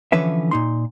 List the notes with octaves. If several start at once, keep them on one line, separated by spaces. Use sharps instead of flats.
D3 E3 F3 C#4 B4 E5
A#2 D#4 C6